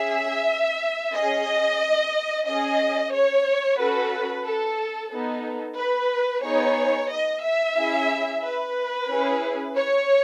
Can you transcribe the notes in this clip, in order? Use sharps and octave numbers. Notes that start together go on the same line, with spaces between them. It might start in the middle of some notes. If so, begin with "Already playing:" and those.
Already playing: C#4 G#4 E5
C#4 G#4 D#5
C#4 G#4 D#5
C#5
C#4 F#4 A4 B4
A4
B3 D#4 A4
B4
B3 D#4 G#4 C#5
D#5
E5
C#4 E4 G#4
B4
C#4 E4 G#4
C#5